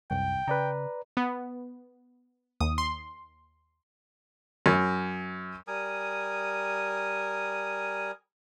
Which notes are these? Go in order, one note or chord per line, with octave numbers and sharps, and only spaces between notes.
C2 F#2 G5
C#3 B4 D5 A#5
B3
D#2 D#6
C6
F#2
G3 A#4 G#5 D#6